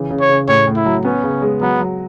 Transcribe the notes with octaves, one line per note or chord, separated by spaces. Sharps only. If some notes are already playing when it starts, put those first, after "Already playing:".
Already playing: C#3 E3
C#3
C#5
C#3
A2 C#5
A2
E4
F#3
B3 C#4
C#3
G#3
F#3 B3
F#3